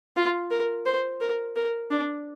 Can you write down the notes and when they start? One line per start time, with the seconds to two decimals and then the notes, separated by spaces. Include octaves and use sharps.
0.16 F4
0.51 A#4
0.86 C5
1.21 A#4
1.56 A#4
1.91 D4